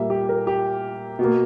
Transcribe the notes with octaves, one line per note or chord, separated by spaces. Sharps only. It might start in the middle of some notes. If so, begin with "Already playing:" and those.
Already playing: A#2 G3 A#3 E5
G4
A#4
G4
B2
A#3